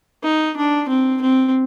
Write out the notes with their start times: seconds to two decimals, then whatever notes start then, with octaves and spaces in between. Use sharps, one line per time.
0.23 D#4
0.57 D4
0.89 C4
1.21 C4